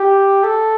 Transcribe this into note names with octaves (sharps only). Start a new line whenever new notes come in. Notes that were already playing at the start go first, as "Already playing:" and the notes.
Already playing: G4
A4